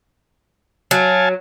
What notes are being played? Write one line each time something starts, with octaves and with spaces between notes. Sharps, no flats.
F#3 F5 G#5 A5